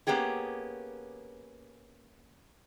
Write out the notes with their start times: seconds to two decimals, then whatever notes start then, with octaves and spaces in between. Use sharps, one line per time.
0.07 A#3 B3 C#4 G4 G#4